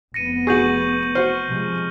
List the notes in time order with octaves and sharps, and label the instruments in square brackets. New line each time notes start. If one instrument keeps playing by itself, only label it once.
[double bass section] F1 B3 [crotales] A#6 C#7 D#7
[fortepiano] F#4 G#4 [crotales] C#6 G6 F#7
[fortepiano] F#4 C5 [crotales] F6
[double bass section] C3 F3 G#3